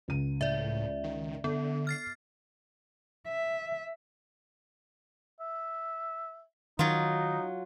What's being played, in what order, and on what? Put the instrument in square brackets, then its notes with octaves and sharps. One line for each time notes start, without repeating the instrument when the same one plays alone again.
[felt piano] C#2 D#7
[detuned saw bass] A2 [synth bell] D5 E5
[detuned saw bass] D#3
[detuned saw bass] D3 [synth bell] B3 [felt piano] A4
[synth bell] F6 A6 C7
[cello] E5
[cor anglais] E5
[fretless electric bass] D#3 [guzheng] F#3 F4 [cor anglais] D#4